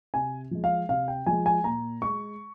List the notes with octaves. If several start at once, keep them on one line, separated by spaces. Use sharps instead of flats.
C3 G#5
F3 G#3
F5
C3 F5
G5
F3 G#3 G#5
G#5
A#2 A#5
G#3 C#6